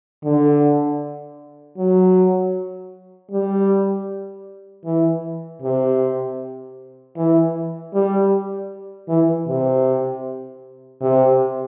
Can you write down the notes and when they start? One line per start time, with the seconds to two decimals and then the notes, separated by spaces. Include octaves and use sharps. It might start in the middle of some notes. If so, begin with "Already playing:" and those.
0.24 D3
1.78 F#3
3.31 G3
4.85 E3
5.62 C3
7.16 E3
7.94 G3
9.09 E3
9.47 C3
11.01 C3